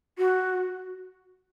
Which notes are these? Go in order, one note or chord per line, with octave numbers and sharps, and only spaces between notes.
F#4